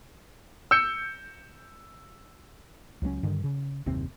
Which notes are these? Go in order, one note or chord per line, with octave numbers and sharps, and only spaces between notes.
E6 G6 C#7
C#2 F#3 A3 C#4
G2 D3 D#3
C#3
F#1 D#2 C3 C4